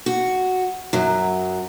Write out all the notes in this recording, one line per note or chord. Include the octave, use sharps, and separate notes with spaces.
F#4
F#2 F#3